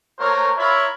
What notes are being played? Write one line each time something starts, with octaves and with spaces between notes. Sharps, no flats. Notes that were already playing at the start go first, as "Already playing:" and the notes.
A3 A#3 F#4 A#4 C5 C#5
E4 F4 A#4 C#5 E5 B5